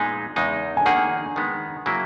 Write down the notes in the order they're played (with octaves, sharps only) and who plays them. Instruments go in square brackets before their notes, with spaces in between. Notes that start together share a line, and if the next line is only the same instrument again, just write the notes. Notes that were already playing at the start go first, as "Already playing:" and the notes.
Already playing: [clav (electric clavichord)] A#2 G#3 B3 D#4 G#4 [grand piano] G#5
[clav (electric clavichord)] E2 C#3 G#3 D#4
[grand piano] G#5
[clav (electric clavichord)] D#3 A#3 D#4 G#4 [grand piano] F#5
[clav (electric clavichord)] D#3 G#3 B3
C#3 F#3 A#3 E4